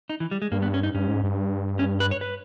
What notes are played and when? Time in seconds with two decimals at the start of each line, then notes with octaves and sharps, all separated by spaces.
0.09 D#4
0.20 E3
0.31 G3
0.42 G#3
0.51 G2 A#3
0.62 B3
0.74 C#4
0.83 D#4
0.94 G2 C#4
1.08 G#2
1.23 G2
1.79 C#4
2.00 B4
2.11 C#5
2.21 B4